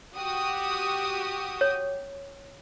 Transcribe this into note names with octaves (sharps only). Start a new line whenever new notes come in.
F#4 G4 D#6
C#5